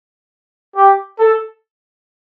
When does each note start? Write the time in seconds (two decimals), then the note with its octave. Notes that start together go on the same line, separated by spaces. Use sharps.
0.76 G4
1.19 A4